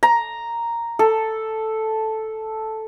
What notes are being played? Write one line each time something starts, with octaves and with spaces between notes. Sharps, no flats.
A#5
A4